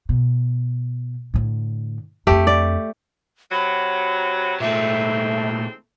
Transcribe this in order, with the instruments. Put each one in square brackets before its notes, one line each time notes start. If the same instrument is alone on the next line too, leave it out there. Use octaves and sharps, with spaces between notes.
[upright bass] B2
A2 D3
[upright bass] F2 D4 [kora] A3 G4 G5
[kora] D5
[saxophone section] C3 F#3 [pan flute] B5
[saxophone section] D#2 G#3 C4 [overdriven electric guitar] A#2 A3 [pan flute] E5